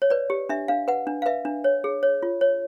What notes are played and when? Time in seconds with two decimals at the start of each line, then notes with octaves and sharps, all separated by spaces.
0.02 C#5
0.10 B4 D5
0.30 G4
0.49 D4 E5
0.68 D4 F5
0.88 B4 F#5
1.07 D4
1.22 F5
1.26 B4 E5
1.45 D4
1.64 C#5
1.84 G#4
2.03 C#5
2.23 F4
2.41 C#5